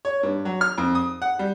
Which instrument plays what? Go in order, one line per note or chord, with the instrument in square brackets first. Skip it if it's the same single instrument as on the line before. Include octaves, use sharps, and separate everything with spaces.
[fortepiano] C#5
G2
F#3
F6
F2
D#6
F#5
G3